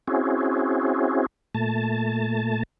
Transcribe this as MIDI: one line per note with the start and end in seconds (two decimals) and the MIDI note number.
0.07 1.26 60
0.07 1.26 61
0.07 1.26 64
0.07 1.26 66
0.07 1.26 68
1.55 2.63 46
1.55 2.63 57
1.55 2.63 81